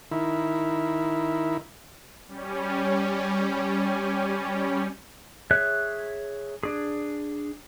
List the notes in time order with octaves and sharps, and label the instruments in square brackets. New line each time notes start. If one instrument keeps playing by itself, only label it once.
[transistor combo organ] D#3 E4
[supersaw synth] G3 C#4
[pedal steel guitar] G#4 C#5 E5 F#6
D4 G#4